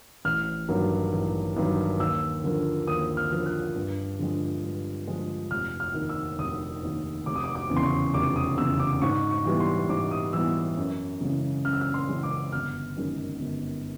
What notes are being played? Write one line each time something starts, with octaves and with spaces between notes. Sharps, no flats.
A1 F6
G2 D#3 F#3 A#3
A1
G2 D#3 F#3 A#3
D#2 E6
D3 F3 A#3
D#2 D#6
F6
D3 F3 A#3
F#6
G2
D3 F3 G#3
G2
D3 F3 G#3
F1 F6
F6
D#2 D#3
E6
F1 D#6
D#2 D#3
F1 D6
D#6
D6
D6
E2 C#3
C6
C#6
F1 D6
D#6
E2 C#3 E6
D6
G#2 C#6
C#6
E3 G3 B3
C6
G#2 D6
D#6
E3 G3 B3 E6
F#2
C#3 E3 G#3
F#2 F6
E6
F6
C6
C#3 E3 G#3
D6
G1 F6
F#2 D#3 G#3
G1